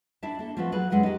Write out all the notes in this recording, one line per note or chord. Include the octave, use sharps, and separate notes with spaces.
D4 E4 E5 A5
A#3 A4
F3 A3 B3 C4 D4 B4
F#3 F#4 G#4 B4
F#2 G#3 E4 G#4 F#5
D#4 G4